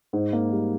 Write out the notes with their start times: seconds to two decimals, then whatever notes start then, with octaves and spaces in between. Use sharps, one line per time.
0.13 G#2 C5
0.33 A#3
0.52 G3